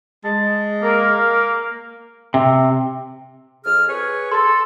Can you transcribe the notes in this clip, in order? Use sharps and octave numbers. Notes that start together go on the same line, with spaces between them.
G#3 A5
A#3 A#4
C3
F2 G#4 F6
G#4 B4 C#5
A4 C6 A6